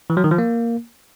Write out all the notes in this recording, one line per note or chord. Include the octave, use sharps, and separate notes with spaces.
E3
F#3
D#3
F3
A#3